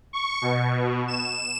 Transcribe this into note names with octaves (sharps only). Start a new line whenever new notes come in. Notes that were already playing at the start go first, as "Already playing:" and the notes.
C#6
B2
E7